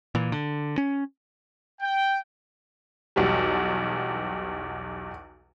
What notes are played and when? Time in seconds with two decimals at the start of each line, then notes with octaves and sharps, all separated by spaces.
0.15 A#2 E3
0.32 D3
0.78 C#4
1.80 G5
3.16 B1 E2 G3